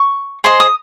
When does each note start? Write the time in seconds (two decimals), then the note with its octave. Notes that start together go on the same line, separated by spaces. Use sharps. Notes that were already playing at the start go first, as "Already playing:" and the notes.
Already playing: C#6
0.44 G#4 C5 D#5 C6
0.60 D#6